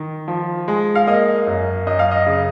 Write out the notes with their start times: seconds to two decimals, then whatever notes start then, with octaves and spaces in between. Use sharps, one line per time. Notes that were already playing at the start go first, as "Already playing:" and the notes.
Already playing: D#3
0.28 F3
0.68 G#3
0.95 F5
1.07 A#3 D#5
1.47 F#2
1.87 F#2 D#5
1.99 F5
2.11 D#5
2.26 C#3